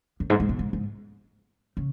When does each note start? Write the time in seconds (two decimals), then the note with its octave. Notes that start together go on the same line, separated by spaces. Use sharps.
0.20 F#2
0.30 G#2
0.40 G#2
0.49 B2
0.59 G#2
0.73 G#2
1.77 C#3